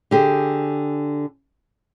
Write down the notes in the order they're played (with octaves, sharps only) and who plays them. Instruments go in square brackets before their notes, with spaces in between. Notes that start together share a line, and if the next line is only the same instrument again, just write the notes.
[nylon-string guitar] D3 G4 G#4